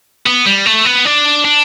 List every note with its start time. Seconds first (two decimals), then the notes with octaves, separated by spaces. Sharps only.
0.26 B3
0.46 G3
0.66 A3
0.85 B3
1.05 D4
1.45 D4